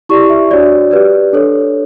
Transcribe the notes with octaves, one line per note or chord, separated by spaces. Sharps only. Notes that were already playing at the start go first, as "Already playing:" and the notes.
E4 G4 D5 C#6
E5
D4 F#4 C#5 D5
G4 B4 D5
D4 A4 C#5